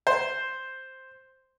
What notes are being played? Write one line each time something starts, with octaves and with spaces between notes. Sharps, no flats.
C5